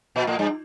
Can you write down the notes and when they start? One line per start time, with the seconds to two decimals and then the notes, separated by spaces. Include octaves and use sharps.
0.16 A#2
0.27 A2
0.39 G2